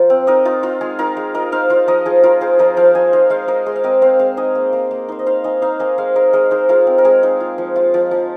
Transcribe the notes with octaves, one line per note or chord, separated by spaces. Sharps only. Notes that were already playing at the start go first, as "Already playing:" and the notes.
Already playing: F3 F4 A#4 C5 F5
C4
D#4 A#4 D#5
D#4 F4
D#4 F4
G#3 G#4
D#4 F4 A#4
G#3
D#4 A#4 D#5
D#4 C5 F5
F4 C5 F5
F3 A#4 D#5
F3 G#4
F3 F4 A#4
F4 G#4 C5
F3 A#4 D#5
F3 C5 F5
F4 D#5 G#5
D#4 C5 F5
G#3 C5 F5
G#3 A#4 D#5
G#3 G#4 C5
F5
C4 A#4 D#5
C4 C5 F5
G#3 C5 F5
D#4 D#5 G#5
A#3
A#3
A#3
D#4 C5
D#5
D#4 C5 F5
D#4 D#5 G#5
D#4 C5 F5
A#3 D#5 G#5
G#3 C5 F5
G#3 A#4 D#5
G#3 A#4 D#5
D#4 G#4 C5
G#3 F4 A#4
C4
A#4
G#3 G#4
D#4
F4
F3
F4
F3
F3